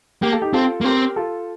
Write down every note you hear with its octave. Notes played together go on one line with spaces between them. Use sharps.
A#3 G4
A4
D#4 G4
C4 F4 A4
A#3
C4 G4 A#4
F4 A4